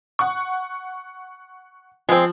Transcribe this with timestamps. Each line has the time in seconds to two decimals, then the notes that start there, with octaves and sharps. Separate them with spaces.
0.19 F#5 C#6
2.09 F3 G#3 C4